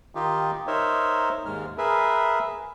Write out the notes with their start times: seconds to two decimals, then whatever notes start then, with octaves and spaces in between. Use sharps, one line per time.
0.15 D#3 D#4 F4 G4
0.67 D#4 A#4 C5 C#5 E5
1.46 D#2 G#2 G#3 F6
1.78 G#4 A#4 B4 E5